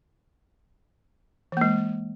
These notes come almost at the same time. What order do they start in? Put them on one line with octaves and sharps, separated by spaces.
E3 A#3 G#3